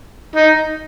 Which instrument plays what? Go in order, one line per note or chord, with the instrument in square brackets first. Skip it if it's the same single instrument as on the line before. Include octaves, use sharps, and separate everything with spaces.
[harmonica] D#4